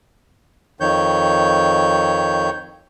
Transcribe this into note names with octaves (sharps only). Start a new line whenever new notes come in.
F2 D#3 C#5 G6